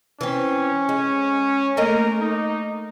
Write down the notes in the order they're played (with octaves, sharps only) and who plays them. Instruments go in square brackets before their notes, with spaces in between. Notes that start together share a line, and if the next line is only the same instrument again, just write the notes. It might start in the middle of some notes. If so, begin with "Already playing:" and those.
[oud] E3 C4 [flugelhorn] C#4
[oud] G#3
[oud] A3 A#3 D#5 [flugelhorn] A#4
[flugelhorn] D#4